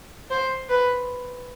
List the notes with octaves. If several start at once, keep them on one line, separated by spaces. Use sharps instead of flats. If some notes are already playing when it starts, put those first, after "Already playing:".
C5
B4